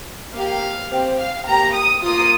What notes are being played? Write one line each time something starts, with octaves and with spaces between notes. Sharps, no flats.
A#3 G4 F5
C4 G4
F5
A#3 G4 A#5
D#6
A#3 F4 D#6